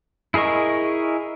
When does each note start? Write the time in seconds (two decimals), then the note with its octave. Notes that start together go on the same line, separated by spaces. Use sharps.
0.34 E4 G#4 A#4 D#5 C#6